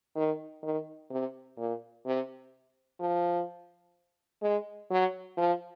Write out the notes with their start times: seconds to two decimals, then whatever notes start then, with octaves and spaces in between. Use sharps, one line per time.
0.16 D#3
0.63 D#3
1.10 C3
1.57 A#2
2.06 C3
3.00 F3
4.42 G#3
4.91 F#3
5.37 F3